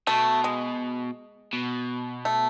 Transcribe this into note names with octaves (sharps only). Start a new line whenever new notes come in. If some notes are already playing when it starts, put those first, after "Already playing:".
B2 A3
G#3
B2
A3